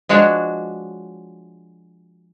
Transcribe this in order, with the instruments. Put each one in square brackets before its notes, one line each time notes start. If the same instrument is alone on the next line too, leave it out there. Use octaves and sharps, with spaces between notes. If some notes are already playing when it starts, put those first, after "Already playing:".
[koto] F3 G#3 D4 F#4 C#5